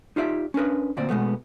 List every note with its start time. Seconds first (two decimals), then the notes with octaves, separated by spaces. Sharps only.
0.16 D#4 F4 G4 D5 E5
0.54 C#4 D4 A#4 B4
0.97 D2 A#2 C4 D5
1.09 B2 G#3 A3 B3